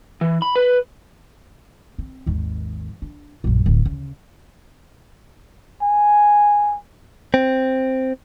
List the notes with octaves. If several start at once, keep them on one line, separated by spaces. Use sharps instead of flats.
E3
B5
B4
C4
G#1 D#2
D4
A#1 F#2
D1
C#3
G#5
C4